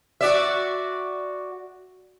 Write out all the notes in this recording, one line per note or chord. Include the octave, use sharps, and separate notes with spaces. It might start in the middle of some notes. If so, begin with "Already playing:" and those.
F#4 D5 E5